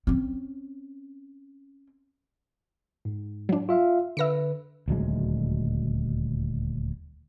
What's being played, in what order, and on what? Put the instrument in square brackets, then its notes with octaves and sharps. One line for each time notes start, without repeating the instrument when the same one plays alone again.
[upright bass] C4 C#4
[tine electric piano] G#2
[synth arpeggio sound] F#3 D4
[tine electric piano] F4 E5 F5
[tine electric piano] D3 B4 [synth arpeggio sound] E5 A#6 C#7
[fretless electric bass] D#1 D2 F#3 G#3